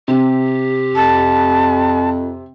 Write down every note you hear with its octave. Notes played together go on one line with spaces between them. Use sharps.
C3 G4
F2 A5